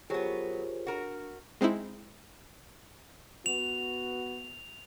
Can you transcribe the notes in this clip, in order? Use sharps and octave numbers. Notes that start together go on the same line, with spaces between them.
F#3 B3 F4 G4 G#4 A#4 C5 C#5
D4 F#4 A#4
G#3 C4 D#4 E4
B3 F#4 F7